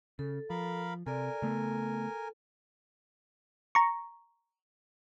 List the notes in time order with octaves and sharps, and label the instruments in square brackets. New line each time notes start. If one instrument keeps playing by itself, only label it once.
[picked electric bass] C#3 [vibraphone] A4
[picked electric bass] F3 [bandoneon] A#4 F5 B5
[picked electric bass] C3 [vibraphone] A4 D5 [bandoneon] A#4 G#5
[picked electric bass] C#3 A3 B3 [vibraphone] A4
[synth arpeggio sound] A#5 C#6